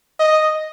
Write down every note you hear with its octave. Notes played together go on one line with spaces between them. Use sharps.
D#5